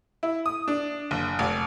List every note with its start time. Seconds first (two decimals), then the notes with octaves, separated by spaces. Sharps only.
0.23 E4
0.46 D#6
0.68 D4
1.11 F#1
1.39 F1